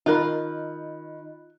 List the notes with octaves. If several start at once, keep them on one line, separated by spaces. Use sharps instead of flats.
D#3 F4 A#4 D#5 B5 F#6